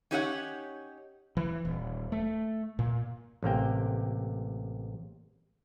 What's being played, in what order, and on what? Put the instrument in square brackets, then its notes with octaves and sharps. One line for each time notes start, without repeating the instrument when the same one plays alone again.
[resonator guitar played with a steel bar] C#4 D#4 G4 C#5 D#5 F#5
[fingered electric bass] E3
D#1
A3
A#2
[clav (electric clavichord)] A1 C3 A#3 G5